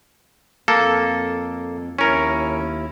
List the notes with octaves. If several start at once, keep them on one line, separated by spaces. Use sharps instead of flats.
F2 A#3 A4
D#2 C#4 E4 A#4